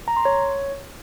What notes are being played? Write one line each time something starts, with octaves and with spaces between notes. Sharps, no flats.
A#5
C6
C#5